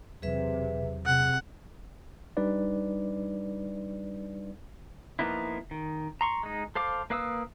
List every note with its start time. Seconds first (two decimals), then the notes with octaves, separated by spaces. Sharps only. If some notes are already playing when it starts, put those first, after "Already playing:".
0.22 E1 E2 C3 F#3 G#4 B4 E5
1.06 C3 G#4 F#5
2.37 G3 D4 D#4 B4 D5
5.19 F3 A#3 B3 D#4 E4
5.71 D#3
6.21 A#5 C6 C#6
6.43 G#3 D#4
6.75 A4 C5 F5 D6
7.10 A#3 B4 F5 D#6 E6